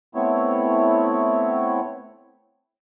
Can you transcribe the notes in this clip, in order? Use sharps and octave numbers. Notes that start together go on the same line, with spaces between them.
A3 B3 C4 E4 C#5